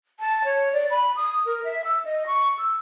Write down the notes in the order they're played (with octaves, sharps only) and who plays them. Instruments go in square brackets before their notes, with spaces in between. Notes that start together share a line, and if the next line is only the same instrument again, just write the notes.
[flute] A5
C#5
D5
B5
D#6
A#4
E5
E6
D#5
C#6
E6